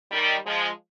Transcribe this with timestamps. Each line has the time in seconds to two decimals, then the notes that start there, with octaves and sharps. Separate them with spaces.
0.11 D#3 G3
0.45 F3 G#3